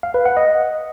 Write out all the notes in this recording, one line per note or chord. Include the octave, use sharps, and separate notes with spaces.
F5
B4
F#5
D#5